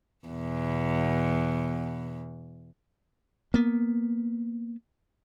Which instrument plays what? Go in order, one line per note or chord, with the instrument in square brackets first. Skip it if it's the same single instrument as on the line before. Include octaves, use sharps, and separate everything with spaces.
[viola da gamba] E2 B2
[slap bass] A#3 B3